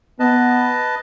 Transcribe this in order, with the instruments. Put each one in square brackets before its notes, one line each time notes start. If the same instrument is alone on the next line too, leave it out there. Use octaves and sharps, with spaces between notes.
[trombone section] B3 [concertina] B4 D#5 A5